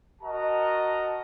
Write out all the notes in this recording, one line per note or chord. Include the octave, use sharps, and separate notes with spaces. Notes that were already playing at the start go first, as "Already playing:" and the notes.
F#4 A#4 D#5 A5 A#5